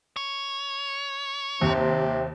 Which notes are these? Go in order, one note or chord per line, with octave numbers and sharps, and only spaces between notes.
C#5
D#2 C3